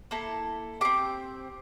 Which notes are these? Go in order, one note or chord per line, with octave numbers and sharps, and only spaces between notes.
A#3 E4 A4
C4 G4 D6